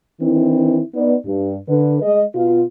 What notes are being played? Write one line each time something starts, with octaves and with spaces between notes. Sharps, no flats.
D#3 E3 C4 D4 E4
B3 D#4 D5
G2
D3 B4
G#3 D#5
B2 F4